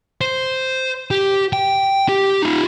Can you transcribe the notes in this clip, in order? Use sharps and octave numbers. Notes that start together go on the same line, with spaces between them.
C5
G4
G5
G4
D#4 F4